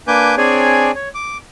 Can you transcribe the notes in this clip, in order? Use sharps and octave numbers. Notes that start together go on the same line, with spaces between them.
A#3 D4 B4 G#5 D6 G6
C4 D4 G#4 C#5 D5 G#5
C#5
D6